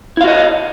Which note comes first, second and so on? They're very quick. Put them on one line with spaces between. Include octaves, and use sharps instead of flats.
E4 F5 F#4 D#5